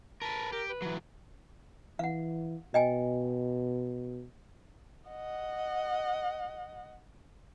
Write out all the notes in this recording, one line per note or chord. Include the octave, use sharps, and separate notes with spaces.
A#4 B4 A5
G4 A#4
B4
E3 F#3
E3 F5 F#5
B2 D#5 G5 G#5
D#5 F#5